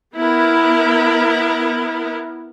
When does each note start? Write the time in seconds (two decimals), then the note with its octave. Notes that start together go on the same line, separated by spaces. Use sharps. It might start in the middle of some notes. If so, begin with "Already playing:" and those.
0.14 B3 E4 A#4